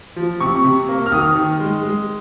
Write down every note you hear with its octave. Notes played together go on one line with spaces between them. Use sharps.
F3
C3 C#6
C3
A#3
F6
D#3 D#6
D#3
G#3
G#3